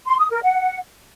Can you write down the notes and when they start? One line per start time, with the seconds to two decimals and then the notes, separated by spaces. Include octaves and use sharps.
0.06 C6
0.18 D#6
0.30 A#4
0.42 F#5